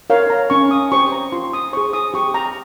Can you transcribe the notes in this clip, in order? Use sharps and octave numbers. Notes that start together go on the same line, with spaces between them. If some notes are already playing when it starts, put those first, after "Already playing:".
A#4 C#5 F5
A#5
C#4 C#6
D#6
G4 C5 C#6
A#5
F4 C6
D#6
G#4 C5 C#6
D#6
G4 C#6
A#5